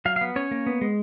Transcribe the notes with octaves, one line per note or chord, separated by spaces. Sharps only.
F#3 F5
F5
B3
C#4 C#5
A#3
B3
G#3